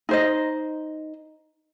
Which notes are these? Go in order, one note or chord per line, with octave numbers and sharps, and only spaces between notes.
D#4 C5 D#5